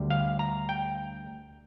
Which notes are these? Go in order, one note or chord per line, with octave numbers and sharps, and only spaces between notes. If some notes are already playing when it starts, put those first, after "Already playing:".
Already playing: D2 D3 G3
F5
A#5
G5